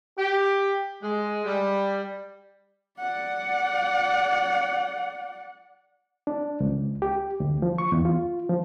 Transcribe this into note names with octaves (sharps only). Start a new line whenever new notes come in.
G4
G#3
G3
D5 F#5
D4
C#2
G4
D2
F3
C#6
E2
F4
F3